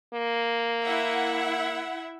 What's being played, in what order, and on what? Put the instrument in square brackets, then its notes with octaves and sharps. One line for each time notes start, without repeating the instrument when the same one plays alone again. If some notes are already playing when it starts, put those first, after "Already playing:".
[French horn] A#3
[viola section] E4 E5 F#5